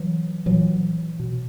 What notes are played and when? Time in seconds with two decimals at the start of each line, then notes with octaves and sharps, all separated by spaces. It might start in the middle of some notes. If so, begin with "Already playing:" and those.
Already playing: E3 F#3
0.46 A#2 E3 F#3
1.19 B2